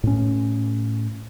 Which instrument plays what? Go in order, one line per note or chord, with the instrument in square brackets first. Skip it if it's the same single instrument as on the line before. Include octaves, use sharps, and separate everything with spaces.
[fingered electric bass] A2 C#4